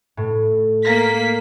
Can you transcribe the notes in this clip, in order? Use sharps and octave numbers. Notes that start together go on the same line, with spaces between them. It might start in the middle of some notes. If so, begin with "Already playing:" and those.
A2
A#3 B6